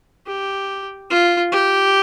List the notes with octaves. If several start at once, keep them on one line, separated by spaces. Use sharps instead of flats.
G4
F4
G4